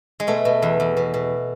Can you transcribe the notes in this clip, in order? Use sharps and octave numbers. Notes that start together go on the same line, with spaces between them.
G#3
B2 A3
B2
E2
E2
B2
B2